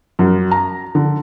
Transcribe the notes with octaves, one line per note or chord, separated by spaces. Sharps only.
F#2
A#5
D3